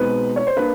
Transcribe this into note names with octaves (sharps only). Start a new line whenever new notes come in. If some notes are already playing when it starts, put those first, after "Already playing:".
Already playing: B2 G#3 C4 D#4 B4
C#5
C5
A#3 D4 B4